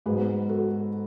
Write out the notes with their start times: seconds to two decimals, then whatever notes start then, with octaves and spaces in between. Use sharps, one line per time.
0.06 G#2 F#3 B3 G#4 B4
0.49 F#4 A4